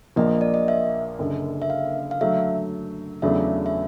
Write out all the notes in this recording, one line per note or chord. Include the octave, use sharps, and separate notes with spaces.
A#1 A#2 F3 A#3 D#5
D5
D#5
E5
F#1 F#2 D3
E5
F5
F5
D3 F#3 A3 E5
E2 C#3 F#3 A3 D4 E5
E5